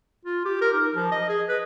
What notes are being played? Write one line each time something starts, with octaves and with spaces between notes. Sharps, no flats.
F4
G4
A#4
D#4
F3
D#5
G#4
B4